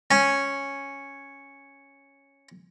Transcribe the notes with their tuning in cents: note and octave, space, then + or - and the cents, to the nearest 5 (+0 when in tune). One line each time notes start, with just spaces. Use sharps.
C#4 -5 G#5 +0